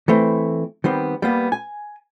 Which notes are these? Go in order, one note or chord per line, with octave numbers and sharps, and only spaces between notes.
E3 A3 C4 E4
D#3 G3 B3 C4
G3 A#3 B3
G#5